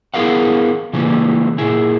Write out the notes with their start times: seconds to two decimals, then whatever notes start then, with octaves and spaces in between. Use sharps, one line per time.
0.14 B3 E4 G#4 A#4 F5 F#5
0.93 C#3 E3 G3 A3 A#3
1.58 A#2 E4 G#4